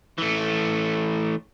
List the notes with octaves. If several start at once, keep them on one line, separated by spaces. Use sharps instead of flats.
E3 A3